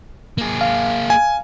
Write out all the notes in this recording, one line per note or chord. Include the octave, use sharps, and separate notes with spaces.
A#3 G#4
F5
G#5